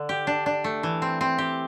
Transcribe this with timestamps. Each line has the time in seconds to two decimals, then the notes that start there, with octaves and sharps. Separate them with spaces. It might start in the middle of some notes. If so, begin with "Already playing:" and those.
Already playing: D3
0.09 G4
0.27 D4
0.46 D4
0.64 A3
0.83 E3
1.02 C4
1.21 C4
1.38 G4